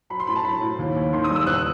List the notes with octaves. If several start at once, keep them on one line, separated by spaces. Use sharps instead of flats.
F#3 B5
C6
A2 B5
A5
F#3 B5
A2
D#2
D#2
D#3 C6
D#6
G3 E6
E2 F#6
F#6